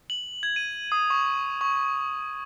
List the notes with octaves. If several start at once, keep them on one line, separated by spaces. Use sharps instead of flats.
F#7
G#6
D#7
D#6
C#6
C#6